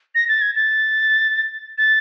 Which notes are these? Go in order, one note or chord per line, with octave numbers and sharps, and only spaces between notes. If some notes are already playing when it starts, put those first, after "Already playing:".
A#6
A6
G#6
A6
A6